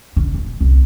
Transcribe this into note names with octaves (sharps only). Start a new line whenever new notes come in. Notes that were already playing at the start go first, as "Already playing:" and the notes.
D3
D#1
C2